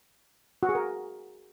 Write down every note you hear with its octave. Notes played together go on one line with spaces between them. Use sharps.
F#4
G#4
A#4